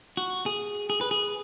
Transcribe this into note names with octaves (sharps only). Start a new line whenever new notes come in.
F#4
G#4
G#4
B4
G#4